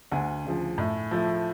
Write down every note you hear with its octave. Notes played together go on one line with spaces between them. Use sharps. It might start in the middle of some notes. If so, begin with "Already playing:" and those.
D2 F#5 G#5
C#3 F3
A2
F3 A3